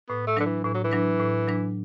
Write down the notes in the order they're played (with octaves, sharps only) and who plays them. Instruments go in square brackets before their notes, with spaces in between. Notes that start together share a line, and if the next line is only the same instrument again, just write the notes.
[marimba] A2 [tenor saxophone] B3
[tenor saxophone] A3
[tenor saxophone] D3 [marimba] F#3 D4 B4
[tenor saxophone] E3
[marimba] A2 [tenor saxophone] E3
[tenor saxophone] F#3
E3
[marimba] F#3 D4 B4
A2
F#3 D4 B4